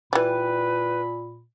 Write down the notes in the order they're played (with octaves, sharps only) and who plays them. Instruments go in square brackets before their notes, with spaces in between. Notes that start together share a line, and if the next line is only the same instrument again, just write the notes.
[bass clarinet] A#2 [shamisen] E3 G3 [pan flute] B4 [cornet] B5